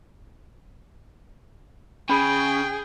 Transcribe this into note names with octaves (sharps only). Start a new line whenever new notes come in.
C#3 G#4 G5 B5